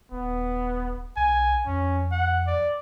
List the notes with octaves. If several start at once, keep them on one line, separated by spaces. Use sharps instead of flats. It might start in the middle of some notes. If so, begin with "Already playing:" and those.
D#1 B3
B1 G#5
F2 C#4
F#5
D5